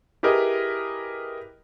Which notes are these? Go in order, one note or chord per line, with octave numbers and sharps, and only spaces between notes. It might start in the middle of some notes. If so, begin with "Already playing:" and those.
E4 G4 G#4 A#4 B4 D#5